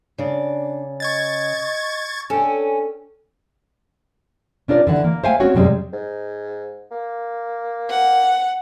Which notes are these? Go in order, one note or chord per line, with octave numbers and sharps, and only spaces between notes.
C#3 D4 D5
D#5 C#6 G#6 A6
C#4 D4 A4 G5
C#4 D4 F4 A#4 D5
D3 E3 F#5
A#3
C5 E5 F5 G5 G#5
C4 C#4 F#4 C#5
F#2 C3 G3 G#3
G#2
A#3
F#5